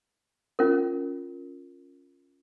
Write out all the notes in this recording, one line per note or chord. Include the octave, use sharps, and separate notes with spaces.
C#4 F4 A#4